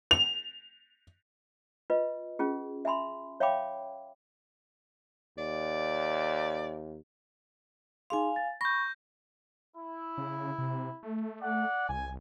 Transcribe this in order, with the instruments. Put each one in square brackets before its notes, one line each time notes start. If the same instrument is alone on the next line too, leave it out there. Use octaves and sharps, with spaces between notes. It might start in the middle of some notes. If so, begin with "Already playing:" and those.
[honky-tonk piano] F7
[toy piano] F4 B4 D#5
C#4 F4 G#4
E5 G#5 B5 C6
C#5 E5 F5 G5 B5 D6
[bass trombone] D#2 [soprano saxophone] D5
[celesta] D#4 G#4 C6 [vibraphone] F5 G#5
[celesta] A6
[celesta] B5 [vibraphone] C#6 [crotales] G6 A#6
[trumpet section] E4
[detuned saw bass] C#3
C3
A3
[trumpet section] D5 F#5
[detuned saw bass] C2 [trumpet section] G#5